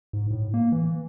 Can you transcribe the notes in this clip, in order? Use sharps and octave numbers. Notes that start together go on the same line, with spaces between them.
G#2
A2
A#3
E3